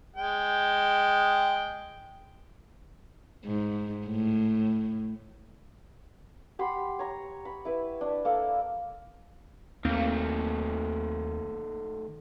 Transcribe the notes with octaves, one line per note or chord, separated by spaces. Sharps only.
G#3 G5
G#2
A2
G4 F#5 B5 C6
C#5 A#5
B5
E4 B4
D4
A#3 A4 D6
D#2 D#3 A3 A#3 C4